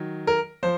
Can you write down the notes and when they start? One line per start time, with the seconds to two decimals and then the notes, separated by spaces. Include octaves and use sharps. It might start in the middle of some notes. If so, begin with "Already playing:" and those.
Already playing: D#3 F#3
0.27 A#4
0.63 F3 C5